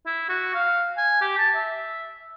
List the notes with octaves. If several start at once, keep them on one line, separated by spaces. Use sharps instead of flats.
E4
F#4
F5
G#5
G4
A5
E5